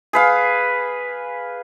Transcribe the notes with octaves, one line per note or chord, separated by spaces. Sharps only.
G#4 B4 F5